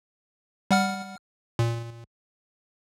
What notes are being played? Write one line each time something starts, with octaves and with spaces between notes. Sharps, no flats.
G3 F#5 F6
A#2